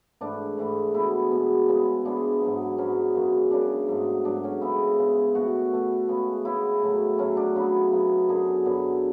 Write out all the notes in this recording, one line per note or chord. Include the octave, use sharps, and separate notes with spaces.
G#2 E3 A3 D4
G#2 E3 A3
B2 G#3 B3 E4
B2 G#3 B3
C#3 E3 G#3 B3
C#3 E3 G#3 B3 D4
G#2 F#3 B3
G#2 F#3 B3 C#4
F#2 C#3 G#3
F#2 C#3 G#3 D4
G#2 F#3 A3
G#2 F#3 A3 D4
C#4
C#3 G#3 B3 E4
C#3 G#3 B3
B2 A3 F#4
B2 A3
C#3 G#3 B3
C#3 G#3 B3 E4
A2 F#3 A3
A2 F#3 A3 C#4
D4
C#3 F#3 B3 E4
C#3 F#3 B3
F#2 D3 F#3 B3 G#4
F#2 D3 F#3 B3